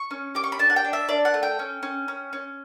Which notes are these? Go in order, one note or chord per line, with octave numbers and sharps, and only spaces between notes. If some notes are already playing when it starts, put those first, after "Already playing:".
Already playing: C#6
C#4
G4 D6
C#6
B5
D4 A5
F#5
G5
D4
E5
D4 D5
F#5
A3
G5
C#4
C#4
C#4
C#4